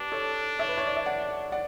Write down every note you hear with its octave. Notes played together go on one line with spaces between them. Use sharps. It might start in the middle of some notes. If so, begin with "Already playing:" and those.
Already playing: D4 G4 B4
A4 C#5
C#5 E5
B4
C#5
D5
E5
D5 F#5
D5 F#5